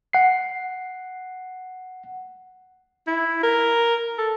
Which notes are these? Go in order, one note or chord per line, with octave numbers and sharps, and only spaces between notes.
F#5 C7
E4
A#4
A4